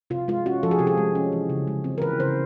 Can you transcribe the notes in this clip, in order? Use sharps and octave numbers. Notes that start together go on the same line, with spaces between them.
C3 F4
G#3 F4
C#4 F#4
F3 A4
G#4
C3 G4
G#4
G#3
C#4
E3
C#3
G#3
C4
A#4
E3 B4
C#3 C5